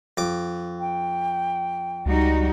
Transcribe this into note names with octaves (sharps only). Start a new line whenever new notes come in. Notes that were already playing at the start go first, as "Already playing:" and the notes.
F2 D6
G5
C#2 G3 D#4 F#4